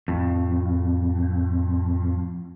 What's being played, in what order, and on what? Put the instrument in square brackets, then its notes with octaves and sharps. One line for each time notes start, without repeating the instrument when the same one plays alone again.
[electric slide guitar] F2 A2